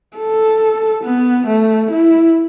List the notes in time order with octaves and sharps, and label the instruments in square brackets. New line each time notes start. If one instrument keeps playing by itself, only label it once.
[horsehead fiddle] A4
B3
A3
E4